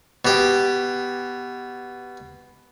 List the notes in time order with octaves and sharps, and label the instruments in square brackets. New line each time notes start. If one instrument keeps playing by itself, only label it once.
[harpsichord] B2 G4